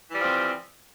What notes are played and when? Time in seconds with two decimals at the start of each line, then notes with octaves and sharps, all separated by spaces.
0.09 E3
0.14 G3
0.19 F3
0.24 C4